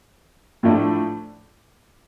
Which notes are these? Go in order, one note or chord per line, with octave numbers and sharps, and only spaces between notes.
A2 F3 A3 D4